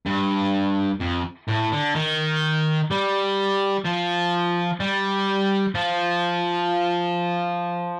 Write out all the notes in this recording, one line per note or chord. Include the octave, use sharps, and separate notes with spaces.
G2
F2
A2
D3
D#3
G3
F3
G3
F3